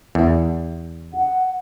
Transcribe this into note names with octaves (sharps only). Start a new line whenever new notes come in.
E2
F#5